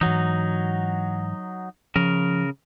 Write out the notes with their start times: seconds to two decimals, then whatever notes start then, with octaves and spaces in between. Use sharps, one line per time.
0.01 G#2 E3 F#3 D#4
1.96 C#3 F3 A#4